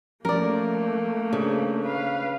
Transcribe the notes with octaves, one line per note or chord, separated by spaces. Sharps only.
F3 A3 A#3 C#4 A#4 D5
C#3 D4 C5
B4 F5